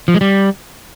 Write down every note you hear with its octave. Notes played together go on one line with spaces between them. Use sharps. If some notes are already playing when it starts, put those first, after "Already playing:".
F3
G#3
G3